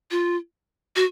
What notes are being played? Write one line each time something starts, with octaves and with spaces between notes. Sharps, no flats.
F4
F#4